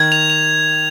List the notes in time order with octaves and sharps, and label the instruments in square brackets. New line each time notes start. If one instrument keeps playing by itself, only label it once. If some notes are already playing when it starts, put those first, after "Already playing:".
Already playing: [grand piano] D#3 [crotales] G#6
[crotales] F7
F7